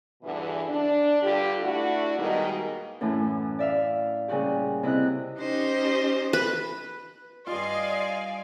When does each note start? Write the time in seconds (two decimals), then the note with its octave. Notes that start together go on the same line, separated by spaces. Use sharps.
0.23 E2 G2 B2 D3 E3
0.69 D4
1.23 G2 D3 F4 G4
1.63 A3 D4 E4 F#4
2.18 B2 D#3 G3 G#3 A#3 D#4
3.01 F#2 A2 E3 A3
3.59 D5 E5 F5
4.28 A#2 C#3 G3 F#4 G4
4.83 C3 E4 D#5 F#6
5.38 C#4 D#4 G4 C5 D#5
6.33 B4
7.47 G2 F4 D5 D#5 F5 G#5 C6